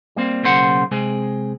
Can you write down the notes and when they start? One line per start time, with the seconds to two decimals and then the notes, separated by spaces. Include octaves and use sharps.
0.16 G3 A#3 C4
0.43 B1 C#3 A#3 C5 F#5
0.91 C3 G#3 C4 G#4